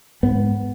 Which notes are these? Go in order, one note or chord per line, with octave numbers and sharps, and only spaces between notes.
G#2 B3